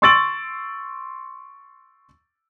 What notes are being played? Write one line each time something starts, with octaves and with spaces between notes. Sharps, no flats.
C6 C#6 E6 A6 D7 F#7